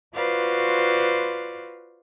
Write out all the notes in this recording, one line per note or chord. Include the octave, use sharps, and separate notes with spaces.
F4 F#4 B4 C5 D5 F5